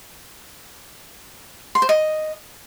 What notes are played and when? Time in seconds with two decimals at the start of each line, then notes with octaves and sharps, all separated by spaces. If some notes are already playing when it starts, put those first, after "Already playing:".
1.75 C6
1.82 C5
1.89 D#5